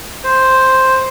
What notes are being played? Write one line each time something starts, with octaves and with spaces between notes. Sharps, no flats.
C5